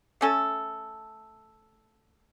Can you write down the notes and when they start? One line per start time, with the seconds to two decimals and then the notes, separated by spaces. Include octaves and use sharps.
0.21 A3 C#4 A4